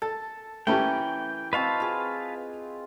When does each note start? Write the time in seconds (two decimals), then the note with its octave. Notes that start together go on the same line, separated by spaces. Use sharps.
0.02 A4 A5
0.67 E3 A3 C#4 G4 B4 G5 A#5
1.53 C4 F#4 B4 D#5 F5 A5
1.80 F4 G#4